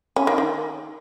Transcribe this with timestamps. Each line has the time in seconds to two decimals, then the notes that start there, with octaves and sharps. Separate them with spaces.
0.16 C#4
0.27 D#3
0.38 D#3